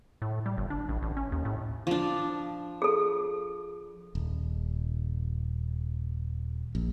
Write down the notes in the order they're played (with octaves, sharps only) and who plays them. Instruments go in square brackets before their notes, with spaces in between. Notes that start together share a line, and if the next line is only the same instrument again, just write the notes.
[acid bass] A2
G3
G1
D4
A1
A1
C#4
D#2
A2
[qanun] F3 D4
[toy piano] G#4 A4
[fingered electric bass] D#1
A#1